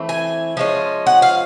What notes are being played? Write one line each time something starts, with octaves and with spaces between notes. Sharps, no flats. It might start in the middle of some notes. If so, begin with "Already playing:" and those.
Already playing: E3 A3 C4
G#5
F3 G#3 C#4
F#5
F5